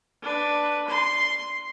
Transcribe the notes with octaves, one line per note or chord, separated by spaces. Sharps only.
D4 B4
C6